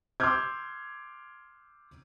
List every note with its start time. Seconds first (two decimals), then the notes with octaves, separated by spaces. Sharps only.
0.20 C6 D6 E6 F6 G6 G#6